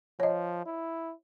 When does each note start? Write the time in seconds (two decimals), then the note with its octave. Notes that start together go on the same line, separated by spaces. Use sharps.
0.20 F3 C#5 D#5
0.66 E4